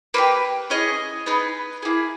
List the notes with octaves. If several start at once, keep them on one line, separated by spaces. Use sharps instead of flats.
A#3 D#4 G4 B4
C#4 E4 G#4 D#5
B3 D#4 G#4 B4
A#3 E4 G#4